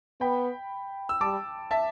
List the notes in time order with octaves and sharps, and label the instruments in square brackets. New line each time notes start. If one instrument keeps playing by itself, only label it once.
[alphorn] B3 [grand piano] G5 B5
[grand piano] E6
[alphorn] G3 [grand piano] A5 D6
[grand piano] E5 A5